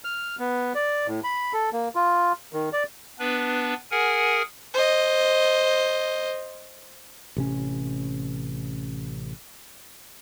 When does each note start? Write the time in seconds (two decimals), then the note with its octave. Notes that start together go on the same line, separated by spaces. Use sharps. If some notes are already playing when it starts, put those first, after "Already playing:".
0.04 F6
0.39 B3
0.75 D5
1.07 A2
1.24 B5
1.53 A4
1.73 A#3
1.95 F4
2.53 D#3
2.73 D5
3.19 B3 D4 B4
3.91 G#4 A#4 F#5 G#5
4.74 C5 D#5
7.36 A1 C3 C#4